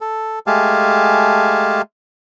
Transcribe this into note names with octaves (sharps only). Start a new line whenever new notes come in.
A4
G#3 A3 G4 F5 G#5 A5